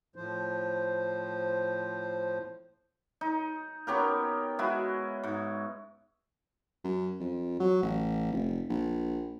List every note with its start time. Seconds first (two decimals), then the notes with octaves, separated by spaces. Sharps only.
0.16 A2 F3 C5
3.21 D#4
3.87 B3 C#4 G4 A#4
4.59 G#3 E4 F#4 G#4
5.23 G#2
6.84 F#2
7.20 F2
7.60 F#3
7.83 A1
8.32 F1
8.70 A#1